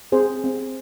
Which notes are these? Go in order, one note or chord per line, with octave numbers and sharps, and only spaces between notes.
C4 G#4 C5
C4